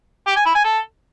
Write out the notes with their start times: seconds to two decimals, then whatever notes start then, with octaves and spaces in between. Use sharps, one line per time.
0.27 G4
0.36 G#5
0.46 E4
0.55 G#5
0.64 A4